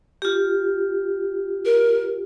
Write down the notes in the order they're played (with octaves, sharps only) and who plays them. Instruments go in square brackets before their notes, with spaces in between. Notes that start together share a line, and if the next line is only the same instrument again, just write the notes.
[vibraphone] F4 G4
[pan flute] A#4